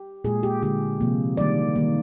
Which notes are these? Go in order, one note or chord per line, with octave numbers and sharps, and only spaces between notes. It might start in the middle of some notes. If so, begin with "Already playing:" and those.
Already playing: G4
A#2 G#3 G#4
G4
D3 G#3 G4
C3 F3 A#3
D#3 G3 A#3 D5
D#3 G3 A#3